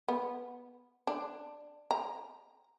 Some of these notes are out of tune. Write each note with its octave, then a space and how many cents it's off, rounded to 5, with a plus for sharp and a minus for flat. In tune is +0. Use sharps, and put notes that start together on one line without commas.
B3 -5
D4 +10
A#5 +0